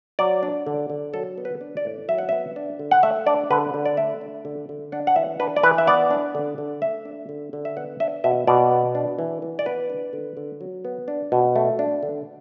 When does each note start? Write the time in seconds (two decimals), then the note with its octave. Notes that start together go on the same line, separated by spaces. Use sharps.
0.19 F#3 D5
0.43 D4
0.67 D3
0.90 D3
1.13 F#3 A4
1.38 B3
1.45 B4
1.61 D4
1.77 D5
1.85 A2
2.08 F#3 E5
2.18 F#5
2.29 B3 E5
2.56 D4
2.79 D3
2.91 F#5
3.03 A3 E5
3.26 D4 D5
3.50 D3 B4
3.74 D3
3.85 D5
3.97 A3 E5
4.21 D4
4.45 D3
4.69 D3
4.92 D4 F#5
5.07 F#5
5.16 E3 E5
5.40 D4 B4
5.56 D5
5.63 E3 B4
5.78 E5
5.87 B3 D5
6.11 D4
6.35 D3
6.58 D3
6.82 A3 E5
7.05 D4
7.29 D3
7.53 D3
7.65 E5
7.77 B3 F#5
8.00 D4 E5
8.24 B2 E5
8.47 B2 D5
8.71 B3
8.95 D4
9.19 E3
9.42 E3
9.59 D5
9.66 B3 B4
9.90 D4
10.13 D3
10.37 D3
10.61 F#3
10.85 B3
11.08 D4
11.32 B2
11.56 A3
11.79 D4
12.03 D3